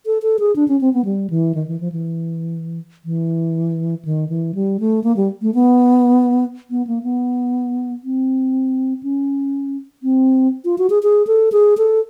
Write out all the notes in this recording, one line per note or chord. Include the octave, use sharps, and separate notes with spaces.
A4
A4
G#4
D4
C#4
C4
B3
G3
E3
D#3
E3
F3
E3
E3
D#3
E3
G3
A3
A#3
G3
A3
B3
B3
A#3
B3
C4
C#4
C4
F4
F#4
G#4
G#4
A4
G#4
A4